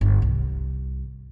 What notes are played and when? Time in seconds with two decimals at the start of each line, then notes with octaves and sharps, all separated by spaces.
0.01 G1
0.22 C2